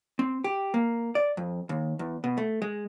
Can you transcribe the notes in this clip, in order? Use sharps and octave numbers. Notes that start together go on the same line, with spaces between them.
C4
G4
A#3
D5
F2
D#2
E2
B2
A3
G#3